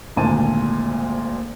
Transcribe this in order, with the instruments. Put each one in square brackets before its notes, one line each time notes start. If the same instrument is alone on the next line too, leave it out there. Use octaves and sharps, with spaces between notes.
[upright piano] G#1 D2 A#2 G#5 A5 D#7